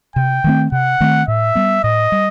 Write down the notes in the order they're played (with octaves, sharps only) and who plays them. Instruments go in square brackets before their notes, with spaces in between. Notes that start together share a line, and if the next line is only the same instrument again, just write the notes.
[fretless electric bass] C3 [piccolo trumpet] G5
[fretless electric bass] D#3 A3 C4
[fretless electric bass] C3 [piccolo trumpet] F#5
[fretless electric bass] D#3 A3 C4
[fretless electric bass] A2 [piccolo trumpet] E5
[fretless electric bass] G3 B3
[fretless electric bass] A2 [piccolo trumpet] D#5
[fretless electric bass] G3